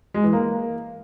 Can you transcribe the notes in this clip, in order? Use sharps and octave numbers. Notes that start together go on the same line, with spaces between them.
G#3
E3
A#3